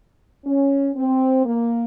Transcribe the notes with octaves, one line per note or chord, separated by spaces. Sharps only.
C#4
C4
A#3